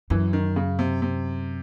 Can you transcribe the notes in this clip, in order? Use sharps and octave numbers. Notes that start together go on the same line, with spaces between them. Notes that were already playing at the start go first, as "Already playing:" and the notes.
F#2 E3
D#3
C#3
C3
C3